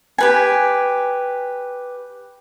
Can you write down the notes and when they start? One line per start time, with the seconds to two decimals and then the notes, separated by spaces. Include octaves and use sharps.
0.18 G4 B4 G#5